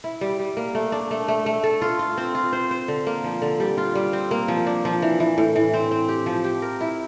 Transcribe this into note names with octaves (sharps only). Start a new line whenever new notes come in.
E4
G3
G3
A#3
A3
D4
A3
A3
A3
A4
F4
F4
C4
F4
C5
C5
D3
A#3
F3
D3
G3
F4
G3
C4
A#3
F3
D4
F3
E3
E3
A2
E3
C4
C4
G4
F3
G4
A#4
E4